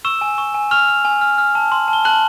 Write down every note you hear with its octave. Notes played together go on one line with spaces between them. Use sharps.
C#6 E6 E7
G#5
C#6
G#5
C#6 F6 F7
F6
G#5
F6
F6
A5
C6
A5
G7
A5 F#6 F#7